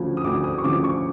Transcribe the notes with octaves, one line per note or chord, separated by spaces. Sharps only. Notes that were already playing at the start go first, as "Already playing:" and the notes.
Already playing: D2 C#3 F3
D#6
D2 D6
D#6
C#6
C#3 F3 D6
C#6